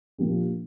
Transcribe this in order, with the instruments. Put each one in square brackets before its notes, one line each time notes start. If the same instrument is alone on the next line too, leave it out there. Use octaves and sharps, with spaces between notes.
[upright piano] A#2 F3 A#3 D4 G4